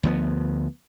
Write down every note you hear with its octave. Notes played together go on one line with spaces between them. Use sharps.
D2 F3 B3